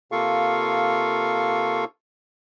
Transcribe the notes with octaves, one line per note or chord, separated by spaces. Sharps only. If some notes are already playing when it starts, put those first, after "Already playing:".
C3 A#3 F4 A4 F5 C#6